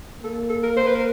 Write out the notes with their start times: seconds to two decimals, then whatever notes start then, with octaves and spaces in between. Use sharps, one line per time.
0.23 A#3 A4
0.50 A4
0.63 A#4
0.77 A#3 C5
0.86 B4
0.95 A#4